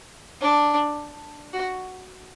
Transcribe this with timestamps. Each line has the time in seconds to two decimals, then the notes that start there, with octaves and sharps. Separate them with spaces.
0.41 D4
1.53 F#4